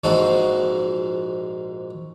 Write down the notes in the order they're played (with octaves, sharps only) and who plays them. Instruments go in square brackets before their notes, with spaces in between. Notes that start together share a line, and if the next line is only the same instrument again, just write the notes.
[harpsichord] A#1 G#2 F3 D#4 F#4 A4